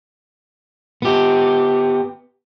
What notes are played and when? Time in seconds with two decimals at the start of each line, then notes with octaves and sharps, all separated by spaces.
1.02 B3 G4